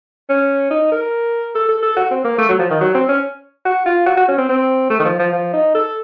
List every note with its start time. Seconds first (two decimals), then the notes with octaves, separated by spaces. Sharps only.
0.30 C#4
0.71 D#4
0.92 A#4
1.55 A4
1.69 A4
1.83 A4
1.96 F#4
2.11 C4
2.24 A#3
2.38 A3
2.49 F#3
2.59 F3
2.71 D#3
2.81 F#3
2.95 C4
3.09 C#4
3.65 F#4
3.86 F4
4.06 F#4
4.17 F#4
4.28 C#4
4.38 C4
4.49 C4
4.90 A3
4.99 D#3
5.05 F3
5.19 F3
5.33 F3
5.54 D#4
5.75 A4